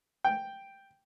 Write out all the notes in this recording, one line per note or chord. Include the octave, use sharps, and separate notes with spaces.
G5